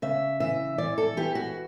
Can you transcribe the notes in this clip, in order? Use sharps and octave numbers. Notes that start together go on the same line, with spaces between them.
C#3 E5
E3 E5
E3 D5
A4
E3 G4
F#4